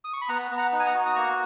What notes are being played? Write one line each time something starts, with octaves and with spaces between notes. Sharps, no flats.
D#6
C#6
B5
B3 F#5 A#5
B3
F#5 A#5
D#4
G#5
F#5 A#5
F#4
D#6
A#3 A#5 C#6